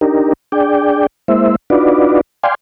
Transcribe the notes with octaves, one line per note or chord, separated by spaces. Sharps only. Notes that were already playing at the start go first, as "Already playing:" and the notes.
D4 D#4 G4 A#4
D4 G#4 D5 G5
G#3 A#3 E4 C5 E5
D4 D#4 F4 F#4 B4 D5
D5 F5 G5 G#5 C6